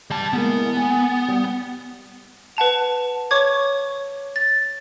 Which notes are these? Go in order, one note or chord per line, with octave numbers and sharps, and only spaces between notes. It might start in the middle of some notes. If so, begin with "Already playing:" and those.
G3 A5
E3 G#3 A#3 B3
G#5
G3
B4 F#5 A5 F7
C#5 C#6 D6 G#6
A6